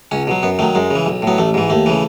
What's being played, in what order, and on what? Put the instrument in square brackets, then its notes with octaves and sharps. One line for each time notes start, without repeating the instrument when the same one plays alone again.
[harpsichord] C#2 C#4
B2 F#3
F#2 B3
D#3 A3
F#3
F#2 G#3
C#3
E3
B1
A2 F#3 B3
A1 A3
G#2 E3
D#2 A3
C#3 E3